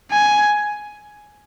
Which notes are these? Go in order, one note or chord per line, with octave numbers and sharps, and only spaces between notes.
G#5